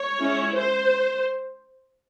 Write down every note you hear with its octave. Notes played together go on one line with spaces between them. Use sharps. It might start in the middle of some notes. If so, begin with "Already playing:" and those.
Already playing: C#5
G#3 C#4 E4
C5